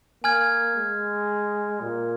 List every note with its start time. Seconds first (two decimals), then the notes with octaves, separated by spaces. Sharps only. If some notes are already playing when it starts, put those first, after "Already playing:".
0.24 A#3 G#5 F6 G#6
0.76 G#3
1.81 A#2